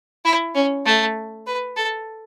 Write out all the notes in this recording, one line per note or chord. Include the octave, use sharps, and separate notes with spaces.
E4
C#4
A3
B4
A4